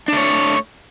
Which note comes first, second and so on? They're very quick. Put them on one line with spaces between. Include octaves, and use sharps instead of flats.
D4 A3 C#5